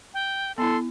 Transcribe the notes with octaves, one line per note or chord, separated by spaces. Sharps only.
G5
B3 E4 A4 C6